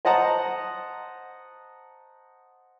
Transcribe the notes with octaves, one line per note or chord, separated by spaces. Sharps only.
C5 D#5 F#5 A5 A#5